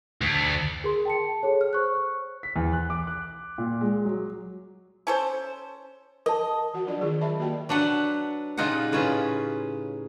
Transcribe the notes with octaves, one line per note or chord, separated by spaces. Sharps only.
D2
G#4 A#4 C6
G5 A5 C#7
G#4 A4 C#5
F6
C5 C#6 F#6
B6
E2
F#6
D6
F#6
A#2
G#3
F#3
C#4 A4 C5
A#4 D#5 A5
E3 F#4 F#5
F#3 D4 F4 D5
D#3 F4 G#4 C#6
A#4 D#5 E5 A5 B5
A#3 F#4 G4 A#4 D5 G5
F#3 D4 B4 F#5
A#2 C#3 D#4 F4 G4 F#5
A2 C#3 C#4 F4 B4